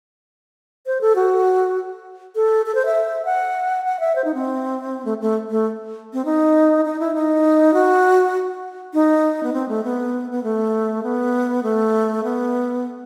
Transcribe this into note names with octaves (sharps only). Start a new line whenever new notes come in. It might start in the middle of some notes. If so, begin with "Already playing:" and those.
C5
A4
F#4
A4
A4
C5
E5
F#5
F#5
E5
C5
D#4
C4
A3
A3
A3
C4
D#4
D#4
E4
D#4
F#4
D#4
B3
C4
A3
B3
B3
A3
B3
A3
B3